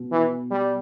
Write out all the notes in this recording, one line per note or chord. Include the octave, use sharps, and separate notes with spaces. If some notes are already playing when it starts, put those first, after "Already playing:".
Already playing: B2
E3
G3